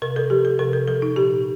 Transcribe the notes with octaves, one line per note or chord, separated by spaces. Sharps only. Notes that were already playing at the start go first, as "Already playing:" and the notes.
C3 A#4
A4
F3 G4
A4
C3 A#4
A4
F3 A4
D#4
A#2 G4